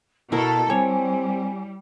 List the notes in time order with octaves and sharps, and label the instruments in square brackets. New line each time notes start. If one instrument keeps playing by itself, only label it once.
[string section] B2 A4 [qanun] E4 A#4 [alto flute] A5
[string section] G3 [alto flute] C4 [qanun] C#5 [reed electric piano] G#5